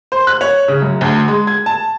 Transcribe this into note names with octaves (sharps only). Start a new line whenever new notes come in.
C5
F#6
C#5
C#3
F#2
D2
G#3
G#6
A5